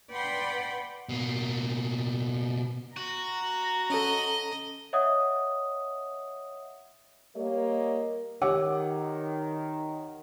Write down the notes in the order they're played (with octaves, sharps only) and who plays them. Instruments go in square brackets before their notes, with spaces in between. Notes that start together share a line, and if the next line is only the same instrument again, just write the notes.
[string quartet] B4 D5 F#5 G5 B5 C6
[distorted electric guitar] B2 A#3
[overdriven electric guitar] F#4 [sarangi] A#5
[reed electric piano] C#4 A4 [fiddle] D#5
[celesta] C#5 D#5 E5 F#5 D#6
[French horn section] G3 A#3 G4 A#4 C#5 D#5
[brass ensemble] D#3 [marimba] G4 E6 [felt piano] C#5 F#5 D6